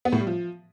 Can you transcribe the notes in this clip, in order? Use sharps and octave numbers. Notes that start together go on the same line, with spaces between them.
B3
A2
G3
F3